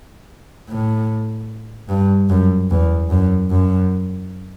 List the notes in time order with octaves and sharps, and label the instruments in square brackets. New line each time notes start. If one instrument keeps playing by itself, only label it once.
[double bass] A2
G2
F#2
E2
F#2
F#2